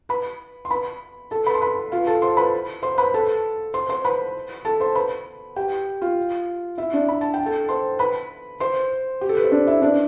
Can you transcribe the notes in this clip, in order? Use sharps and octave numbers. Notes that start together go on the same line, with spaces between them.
B4 B5
C6
B4 B5
A4 A5
B4 B5
C6
B4 B5
F4 F5
A4 A5
C5 C6
B4 B5
C5 C6
B4 B5
A4 A5
C5 C6
C5 C6
B4 B5
A4 A5
C5 C6
B4 B5
G4 G5
F4 F5
E4 E5
D4 D5
B5
A5
G5
A4 A5
C5 C6
B4 B5
C5 C6
G4
A4
B4
C5
D4 D5
E4 E5
D4 D5